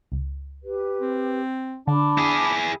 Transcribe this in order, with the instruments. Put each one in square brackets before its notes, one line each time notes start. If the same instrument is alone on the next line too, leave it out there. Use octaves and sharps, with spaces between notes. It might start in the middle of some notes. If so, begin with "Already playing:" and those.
[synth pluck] C#2
[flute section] G4 B4
[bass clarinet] C4
[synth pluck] D3 [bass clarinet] D4 [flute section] A5 B5 D6
[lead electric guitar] E4 G#4